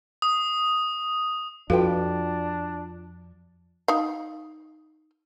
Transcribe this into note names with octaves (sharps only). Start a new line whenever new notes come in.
D#6
F2 D4 F4 F#4 A4 B4 F5 G5
D#4 F5